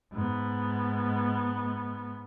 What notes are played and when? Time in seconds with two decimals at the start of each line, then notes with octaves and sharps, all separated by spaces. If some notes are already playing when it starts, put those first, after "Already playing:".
0.13 G#2 B3